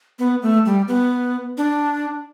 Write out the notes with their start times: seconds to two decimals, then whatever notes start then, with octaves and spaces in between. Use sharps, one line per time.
0.19 B3
0.42 A3
0.66 G3
0.88 B3
1.58 D4